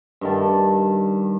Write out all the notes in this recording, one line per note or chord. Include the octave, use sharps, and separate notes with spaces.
G2 D#3 A5